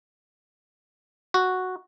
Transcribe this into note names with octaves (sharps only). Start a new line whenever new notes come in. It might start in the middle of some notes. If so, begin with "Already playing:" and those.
F#4